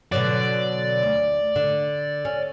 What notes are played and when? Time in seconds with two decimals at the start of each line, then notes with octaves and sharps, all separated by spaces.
0.12 B2 D3 F#3 D5
1.03 D2
1.56 D3
2.25 C#4